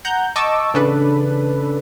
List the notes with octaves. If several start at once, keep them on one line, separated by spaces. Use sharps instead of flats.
F#5 A#5 G6
D#5 A5 C#6 D6 E6
A1 C#3 D4 A4 B4